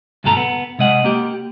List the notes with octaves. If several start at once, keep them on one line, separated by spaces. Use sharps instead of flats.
D2 G2 B2 A3 A4 A#5
B3
C3 G#3 D#5 F#5
A#3 G4